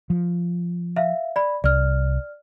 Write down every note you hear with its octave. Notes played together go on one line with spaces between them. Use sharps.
F3
E5 F5
D5 B5
C2 D5 F6